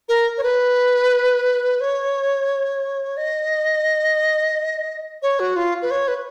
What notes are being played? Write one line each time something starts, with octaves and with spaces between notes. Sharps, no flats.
A#4
C#5
B4
C#5
D#5
C#5
F#4
F4
B4
C#5
B4